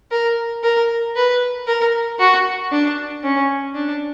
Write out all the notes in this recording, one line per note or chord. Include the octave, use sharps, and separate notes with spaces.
A#4
A#4
B4
A#4
F#4
D4
C#4
D4